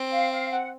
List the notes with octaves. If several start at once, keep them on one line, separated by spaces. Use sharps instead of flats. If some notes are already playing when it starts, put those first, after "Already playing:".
Already playing: C4
F5
F5
F#5